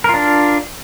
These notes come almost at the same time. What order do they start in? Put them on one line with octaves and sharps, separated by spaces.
A#4 F4 D4